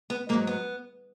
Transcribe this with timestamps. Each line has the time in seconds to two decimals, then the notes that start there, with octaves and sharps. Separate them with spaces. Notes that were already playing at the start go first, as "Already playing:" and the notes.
0.10 B3
0.29 G#2 A#3
0.33 F#3
0.47 B3